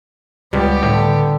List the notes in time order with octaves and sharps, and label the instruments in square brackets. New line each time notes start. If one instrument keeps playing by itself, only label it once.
[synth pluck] C#2 [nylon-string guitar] G3 [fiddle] B3 G4
[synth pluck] A2 [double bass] D3